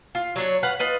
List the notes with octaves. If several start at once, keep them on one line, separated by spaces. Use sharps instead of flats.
F4
F#3 D4 C#5
B4 F5 F#5
F4 B4 D#5